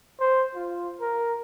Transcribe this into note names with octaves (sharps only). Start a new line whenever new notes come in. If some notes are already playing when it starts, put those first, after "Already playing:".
C5
F4
A#4